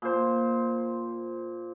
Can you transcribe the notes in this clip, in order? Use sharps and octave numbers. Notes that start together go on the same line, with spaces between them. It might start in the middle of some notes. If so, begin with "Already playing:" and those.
A#2 C5